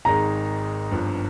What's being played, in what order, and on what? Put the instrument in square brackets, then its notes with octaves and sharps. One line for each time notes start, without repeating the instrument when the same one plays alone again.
[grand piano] G#1 G#2 D#3 G#3 D#4 [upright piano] A#5
[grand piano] G1 G2 F3